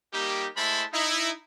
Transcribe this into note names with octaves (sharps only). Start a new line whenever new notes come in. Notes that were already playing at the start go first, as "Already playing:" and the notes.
G3 A#3 D#4 G4
G#3 A3 E4 C5 A5 B5
D#4 E4